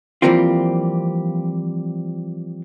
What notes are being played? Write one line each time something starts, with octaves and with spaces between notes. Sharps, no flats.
E3 F3 G3 A#3 C4 F4